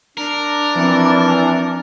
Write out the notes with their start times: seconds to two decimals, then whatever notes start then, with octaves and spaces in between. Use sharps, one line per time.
0.17 D4 A#4
0.75 E3 F3 C4 C#7